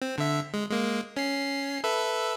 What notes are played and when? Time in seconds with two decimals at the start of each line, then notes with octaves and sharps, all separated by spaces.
0.02 C4
0.18 D3 E5
0.54 G#3
0.70 G#3 A#3
1.17 C#4 C7
1.84 A4 B4 E5